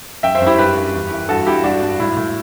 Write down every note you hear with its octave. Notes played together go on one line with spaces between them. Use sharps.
F#2 E5 G5
C5 E5
F#2 E4 G4
G2 G4 B4
G2
E2
E3
G2 F#4 A4
G2 E4 G4
G2 D4 F#4
G2
A2 E4
A2